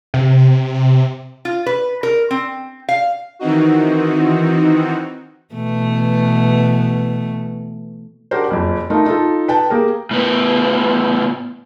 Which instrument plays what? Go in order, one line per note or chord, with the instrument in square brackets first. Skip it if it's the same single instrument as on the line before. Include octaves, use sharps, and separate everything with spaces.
[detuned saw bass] C3
[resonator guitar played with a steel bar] F4
B4
A#4
C4
F5
[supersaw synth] D#3 E3 C4 D#4 F#4
[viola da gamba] B2 E3 A3
[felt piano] D4 F#4 G4 A#4 C5
F#1 F2
F3 A3 D#4 F4 A#4
D#4 F4 A4
B4 G5 A5
A#3 G4 G#4 A#4
[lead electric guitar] A2 B3